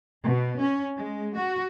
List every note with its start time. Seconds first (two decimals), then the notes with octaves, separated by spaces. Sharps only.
0.23 B2
0.58 C#4
0.97 G#3
1.35 F#4